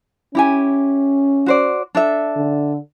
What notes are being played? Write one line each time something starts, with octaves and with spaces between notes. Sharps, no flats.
C#4 E4 G4 G#5
F#4 C5 D5
D4 A4 E5
D3